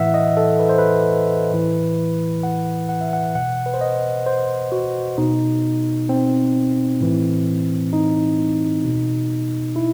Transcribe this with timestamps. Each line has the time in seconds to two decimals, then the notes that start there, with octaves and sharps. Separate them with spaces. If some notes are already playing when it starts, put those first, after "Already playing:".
Already playing: A2 E3 E5 F#5
0.14 D#5
0.37 A4
0.59 B4
0.69 C5
0.78 B4
1.52 A2 E3
2.43 F#5
2.89 F#5
3.01 E5
3.13 F#5
3.35 B2 F#5
3.66 B4
3.74 C5
3.81 D#5
4.26 C5
4.72 F#4
5.18 B2 D#4
6.09 C4
7.01 A2 E3
7.93 D#4
8.84 B2
9.76 E4